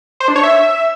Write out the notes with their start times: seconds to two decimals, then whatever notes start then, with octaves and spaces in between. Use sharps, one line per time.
0.20 C5
0.28 D4
0.36 C#5
0.43 E5